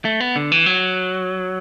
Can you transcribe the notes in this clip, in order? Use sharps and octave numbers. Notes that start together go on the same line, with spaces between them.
A3
B3
D3
E3
F#3